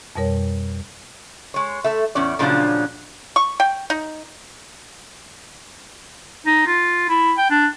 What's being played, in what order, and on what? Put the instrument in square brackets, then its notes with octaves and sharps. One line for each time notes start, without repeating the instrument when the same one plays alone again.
[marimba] F2 B2 G3 A#4 C#5
[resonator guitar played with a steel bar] G#3 C#5
A3 E5
E2 A2 C#4 D5
A#2 C#3 F3 F#3 D4 F4
[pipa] C#6
G5
D#4
[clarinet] D#4
F4
E4
G5
D4